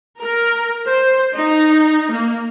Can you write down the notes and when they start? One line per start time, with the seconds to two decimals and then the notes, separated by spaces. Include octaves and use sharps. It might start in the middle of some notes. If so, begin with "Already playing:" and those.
0.19 A#4
0.85 C5
1.34 D#4
2.12 A#3